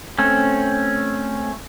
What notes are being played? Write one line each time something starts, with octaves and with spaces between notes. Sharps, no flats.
A3 C4 C#4